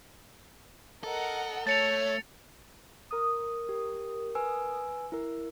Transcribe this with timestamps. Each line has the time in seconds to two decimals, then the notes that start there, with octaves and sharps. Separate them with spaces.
1.04 A4 A#4 D#5 F#5
1.67 A3 C#5 A5 A6 C#7 F7
3.11 A#4 D#6
3.69 G4
4.35 B4 G#5 E6
5.12 E4 A#4